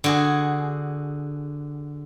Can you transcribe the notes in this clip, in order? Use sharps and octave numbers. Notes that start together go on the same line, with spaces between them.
D3 F#4 G#4